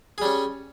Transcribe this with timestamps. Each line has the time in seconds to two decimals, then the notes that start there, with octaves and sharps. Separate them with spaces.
0.18 G#4
0.22 G3
0.25 C#4